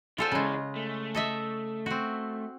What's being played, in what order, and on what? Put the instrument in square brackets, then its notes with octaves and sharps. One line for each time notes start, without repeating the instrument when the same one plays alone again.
[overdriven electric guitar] E3 G#4 [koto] F4 A4 C5
[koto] C#3 G#3
[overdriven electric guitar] A3
[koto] A4 D#5 E5
C4 F#4